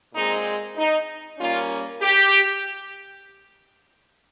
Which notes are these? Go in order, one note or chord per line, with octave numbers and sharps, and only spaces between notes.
A#2 G#3 C4 D#4
D#4
A#2 G3 A#3 C#4 F4
G4